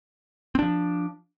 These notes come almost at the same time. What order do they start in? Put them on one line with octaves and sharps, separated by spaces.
C4 D4 F3